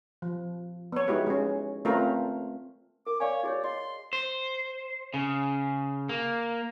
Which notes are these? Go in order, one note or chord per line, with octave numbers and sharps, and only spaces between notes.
F3
B3 C#5
G#3 D#4 E4 F#4 G4 B4
G#3 C#4
A3 C4 C#4 F4 A#4 B4
A#4 D6
C#5 D5 F5 G#5
F#4 G#4 C#5 D5
D#5 C6
C5
C#3
A#3